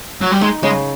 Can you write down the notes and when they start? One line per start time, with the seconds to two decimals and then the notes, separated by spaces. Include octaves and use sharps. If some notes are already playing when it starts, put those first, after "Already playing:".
0.21 F#3
0.31 G3
0.41 G#3 D#4
0.63 C#3 G#3